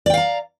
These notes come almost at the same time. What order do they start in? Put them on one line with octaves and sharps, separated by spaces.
D5 G5 F5 A#5